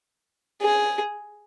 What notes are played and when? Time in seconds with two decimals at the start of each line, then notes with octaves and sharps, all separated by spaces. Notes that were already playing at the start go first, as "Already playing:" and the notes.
0.62 G#4